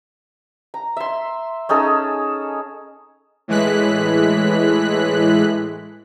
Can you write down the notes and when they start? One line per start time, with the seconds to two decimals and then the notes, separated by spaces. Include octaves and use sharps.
0.74 A#5
0.97 E5 C6
1.69 C#4 D#4 G#4 A4
3.48 A2 E3 G#3 F#6 B6